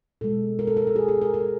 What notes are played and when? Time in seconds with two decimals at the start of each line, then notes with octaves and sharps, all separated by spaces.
0.21 B2 G#3 A4
0.59 A#4
0.67 A4
0.77 A#4
0.87 A4
0.96 G#4
1.08 G#4
1.22 A#4
1.34 A#4